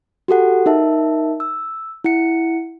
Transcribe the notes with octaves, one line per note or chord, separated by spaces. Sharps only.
F#4 G4 A4 F#5
D#4 A#4 E5 A5
E6
E4 F#5 C#7